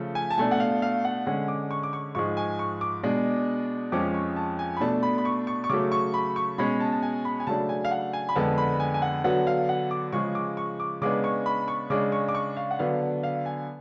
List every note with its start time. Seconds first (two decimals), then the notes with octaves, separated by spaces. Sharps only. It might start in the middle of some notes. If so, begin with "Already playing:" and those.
Already playing: C#3 F3 A3
0.15 G#5
0.30 A5
0.38 B2 A3 D4 G#5
0.51 F#5
0.60 F5
0.82 F5
1.05 F#5
1.26 D3 G#3 C#4 F#5
1.48 D6
1.71 C#6
1.83 D6
1.93 C#6
2.15 G#2 F3 G#3 C#6
2.37 G#5
2.59 C#6
2.81 D6
3.03 B2 G#3 D4
3.92 F2 F3 G#3 C#4 D6
4.14 C#6
4.36 A5
4.59 G#5
4.77 B5
4.81 B2 A3 D4 A5
5.03 B5
5.18 B5
5.25 C#6
5.47 C#6
5.64 C#6
5.69 C#3 F#3 A3 D6
5.92 C#6
6.14 B5
6.36 C#6
6.58 B2 G#3 C#4 B5
6.80 A5
6.92 A5
7.02 G#5
7.25 B5
7.40 G#5
7.47 C#3 F#3 A3 D4 A5
7.69 G#5
7.85 F5
7.91 F#5
8.13 G#5
8.29 B5
8.36 F2 D3 G#3 B3 A5
8.58 B5
8.80 G#5
8.94 G#5
9.02 F#5
9.24 D3 F#3 B3 D4 F#5
9.47 F5
9.69 F#5
9.91 D6
10.13 C#3 F3 G#3 C#6
10.35 D6
10.57 C#6
10.80 D6
11.01 C#3 G#3 B3 D4 D6
11.24 C#6
11.46 B5
11.68 C#6
11.90 C#3 G#3 D4 D6
12.12 C#6
12.29 D6
12.35 C#6
12.57 F5
12.71 F#5
12.79 D3 F#3 B3 D4 F5
13.23 F5
13.46 G#5